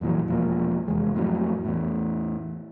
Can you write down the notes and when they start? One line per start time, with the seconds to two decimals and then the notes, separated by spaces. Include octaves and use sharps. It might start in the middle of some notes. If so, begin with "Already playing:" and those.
0.01 F2 A#2 E3 F#3
0.28 E1 F3 A#3
0.88 F1 E2 G#3
1.14 F2 A2 F#3
1.65 E2 A2